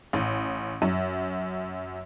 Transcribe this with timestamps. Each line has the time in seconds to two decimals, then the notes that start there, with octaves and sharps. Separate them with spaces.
0.13 A1
0.82 F#2